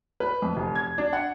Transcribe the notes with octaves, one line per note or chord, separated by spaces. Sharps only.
B4
F2
F1
G#6
D4
F#5